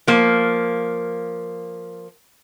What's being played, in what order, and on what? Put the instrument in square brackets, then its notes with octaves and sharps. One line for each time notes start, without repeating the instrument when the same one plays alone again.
[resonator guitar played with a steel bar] F3 A#3